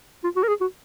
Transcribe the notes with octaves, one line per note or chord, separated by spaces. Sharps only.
F4
F#4
A#4
G#4
F#4